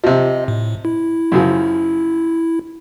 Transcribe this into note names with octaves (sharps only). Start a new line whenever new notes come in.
C3 F3 D#5
A2
E4
F#2 C#3 F3